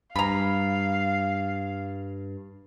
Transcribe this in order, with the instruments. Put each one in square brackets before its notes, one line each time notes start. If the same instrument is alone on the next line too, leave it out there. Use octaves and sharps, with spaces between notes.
[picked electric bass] G2 [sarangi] F5 [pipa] A#5 B5